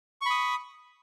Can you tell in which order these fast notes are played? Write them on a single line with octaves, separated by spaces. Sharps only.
C#6 B5 D#6